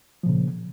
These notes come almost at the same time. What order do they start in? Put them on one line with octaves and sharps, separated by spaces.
F3 A#2 C#3